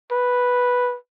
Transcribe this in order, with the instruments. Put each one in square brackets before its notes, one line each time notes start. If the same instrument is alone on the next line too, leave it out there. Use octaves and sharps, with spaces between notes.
[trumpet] B4